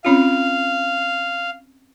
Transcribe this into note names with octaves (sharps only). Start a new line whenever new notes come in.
C4 C#4 F4 F5